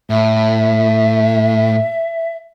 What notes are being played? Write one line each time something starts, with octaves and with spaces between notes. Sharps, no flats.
A2 E5